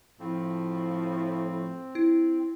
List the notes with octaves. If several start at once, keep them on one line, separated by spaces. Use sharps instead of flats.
A2 F3 C4
E4